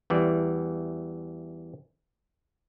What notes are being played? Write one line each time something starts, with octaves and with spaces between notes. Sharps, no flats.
E2 E3 G3 D5